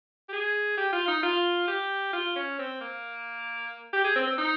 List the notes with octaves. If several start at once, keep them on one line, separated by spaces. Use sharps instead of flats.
G4
G#4
G4
F4
D#4
F4
G4
F4
C#4
C4
A#3
G4
G#4
C4
C4
D#4